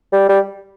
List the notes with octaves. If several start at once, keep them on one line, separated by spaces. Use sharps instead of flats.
G3
G3